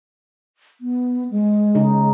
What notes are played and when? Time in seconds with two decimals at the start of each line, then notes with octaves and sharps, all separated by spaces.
0.81 B3
1.31 G#3
1.75 C#3 D#4